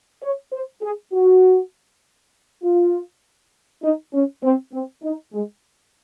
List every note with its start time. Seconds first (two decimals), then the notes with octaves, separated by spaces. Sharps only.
0.22 C#5
0.53 C5
0.82 G#4
1.12 F#4
2.63 F4
3.82 D#4
4.13 C#4
4.43 C4
4.73 C4
5.03 D#4
5.33 G#3